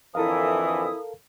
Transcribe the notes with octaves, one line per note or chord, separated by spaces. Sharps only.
F2 D3 E3 E4 A4 A#4 F5 D#6